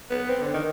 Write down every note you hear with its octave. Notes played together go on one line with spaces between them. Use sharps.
B3
C4
D3
D#3